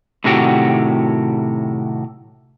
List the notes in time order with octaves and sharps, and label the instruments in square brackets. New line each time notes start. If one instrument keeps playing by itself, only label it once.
[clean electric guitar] A2 C3 D#3 F#3 F#4 G4